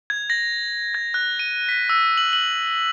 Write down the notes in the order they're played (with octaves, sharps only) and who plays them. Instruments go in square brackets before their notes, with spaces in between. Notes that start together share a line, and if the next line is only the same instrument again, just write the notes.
[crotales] G#6
A#6
G#6
F#6
D#7
B6
E6
F#7
F#7